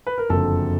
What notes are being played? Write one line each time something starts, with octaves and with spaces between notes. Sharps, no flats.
B4
A#4
F#1 F2 D3 A4